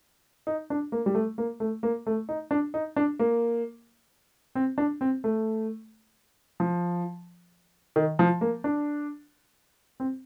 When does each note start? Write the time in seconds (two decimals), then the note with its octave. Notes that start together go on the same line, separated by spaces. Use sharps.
0.47 D#4
0.70 D4
0.92 A#3
1.06 G3
1.15 A3
1.38 A#3
1.60 A3
1.83 A#3
2.06 A3
2.29 D#4
2.51 D4
2.74 D#4
2.96 D4
3.19 A#3
4.55 C4
4.78 D4
5.01 C4
5.24 A3
6.60 F3
7.96 D#3
8.19 F3
8.41 A#3
8.64 D4
10.00 C4